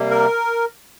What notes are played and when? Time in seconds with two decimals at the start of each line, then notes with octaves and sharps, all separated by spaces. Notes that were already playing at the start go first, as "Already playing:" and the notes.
Already playing: C3 G3 A#3
0.10 A#4